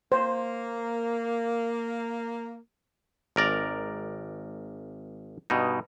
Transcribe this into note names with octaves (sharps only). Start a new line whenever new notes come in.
A#3 C5
G#1 A#4 D5 A#5
G2 B2 D#4